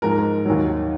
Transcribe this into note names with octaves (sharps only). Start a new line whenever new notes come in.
G#2 F3 G#3 A#4
D#2 D#3 F#3